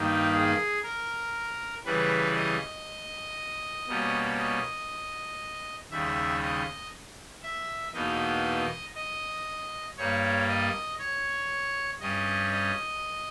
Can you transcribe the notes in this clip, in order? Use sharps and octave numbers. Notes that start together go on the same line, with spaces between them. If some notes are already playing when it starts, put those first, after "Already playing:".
Already playing: G2 D#3 A#3 D#4 G4
G#4
A#4
C#3 E3 G3 B4
D#5
B2 G3 A#3 C#4
D#5
D#2 C#3 G3 E5
D#5
E5
E2 B2 A#3 D#4 D#5
D#5
G2 G3 A#3 C#5
D#5
C#5
G2 G3 C#4 D#5
D#5